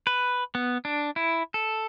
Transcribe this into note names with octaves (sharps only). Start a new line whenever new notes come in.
B4
B3
D4
E4
A4